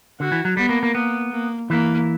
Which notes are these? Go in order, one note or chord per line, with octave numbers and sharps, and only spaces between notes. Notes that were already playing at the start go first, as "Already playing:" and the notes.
D3 F#4
E3
F#3
G3 B3
A#3
A#3
A#3 B3
A#3
E3 A#3